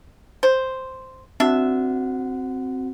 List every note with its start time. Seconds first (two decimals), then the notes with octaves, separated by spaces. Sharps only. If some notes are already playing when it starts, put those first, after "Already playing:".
0.43 C5
1.40 C4 D4 F#4 E5 F#5